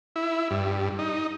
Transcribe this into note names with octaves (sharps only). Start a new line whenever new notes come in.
E4
G2
D#4